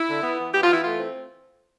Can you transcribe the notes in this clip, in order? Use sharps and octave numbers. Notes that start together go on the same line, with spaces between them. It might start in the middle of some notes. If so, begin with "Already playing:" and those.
Already playing: E4
D3
B3
E3
B3 G4
F4
E3
E4
A3 F4
C4